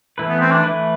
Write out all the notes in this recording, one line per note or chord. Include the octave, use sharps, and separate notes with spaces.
E3 A3 E4 B4
B3
C4
D4
E3 A3 E4 B4